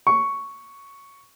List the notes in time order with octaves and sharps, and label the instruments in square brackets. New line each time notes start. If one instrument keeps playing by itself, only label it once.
[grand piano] C#6